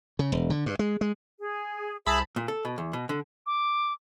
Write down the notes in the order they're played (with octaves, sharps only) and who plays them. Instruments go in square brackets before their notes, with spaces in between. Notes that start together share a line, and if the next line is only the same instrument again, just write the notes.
[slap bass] C#3
E1
D3
G2
G#3
G#3
[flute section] G#4
[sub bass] C2 [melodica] G#4 E5 [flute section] C5 [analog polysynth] A5 B5
[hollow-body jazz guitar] A#2
A4
B2
E2
B2
D3
[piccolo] D6